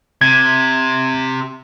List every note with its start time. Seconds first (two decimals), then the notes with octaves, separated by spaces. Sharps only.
0.21 C3 G#6